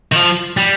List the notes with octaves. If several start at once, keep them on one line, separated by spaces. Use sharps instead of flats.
D#3
F3
G3